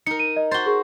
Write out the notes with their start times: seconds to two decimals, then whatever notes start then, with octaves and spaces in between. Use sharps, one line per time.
0.06 D#4 A#4 C#7
0.19 D#7
0.36 D#5
0.51 F#4 C5 A6 G7
0.66 G#4 A#4 C#6